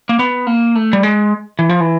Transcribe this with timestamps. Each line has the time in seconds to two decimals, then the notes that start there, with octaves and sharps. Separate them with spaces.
0.09 A#3
0.19 B3
0.47 A#3
0.75 A3
0.93 G3
1.03 G#3
1.59 E3
1.69 F3
1.80 E3